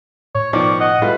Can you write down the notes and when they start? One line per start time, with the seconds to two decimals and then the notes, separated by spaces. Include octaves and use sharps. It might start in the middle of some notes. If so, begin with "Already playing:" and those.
0.35 A2 C#5
0.53 B2 D#3 F3 D5 C#6
0.81 D#5 F#5
1.02 G3 A3 F4 B4